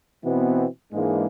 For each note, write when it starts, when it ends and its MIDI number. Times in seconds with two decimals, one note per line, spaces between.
0.24 0.66 47
0.24 0.66 52
0.24 0.66 59
0.24 0.66 60
0.92 1.26 44
0.92 1.26 52
0.92 1.26 56
0.92 1.26 58
0.92 1.26 62